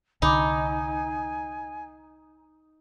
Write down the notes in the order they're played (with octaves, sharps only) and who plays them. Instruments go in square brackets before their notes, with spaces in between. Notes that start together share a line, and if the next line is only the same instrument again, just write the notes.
[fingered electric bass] C2 D3 [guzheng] D#4 [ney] G#5 [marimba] B5 D6